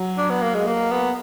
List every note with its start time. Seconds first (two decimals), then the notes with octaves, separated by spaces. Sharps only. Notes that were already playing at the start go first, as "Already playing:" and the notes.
Already playing: F#3
0.18 D4
0.30 B3
0.42 A#3
0.54 G#3
0.67 A#3
0.91 B3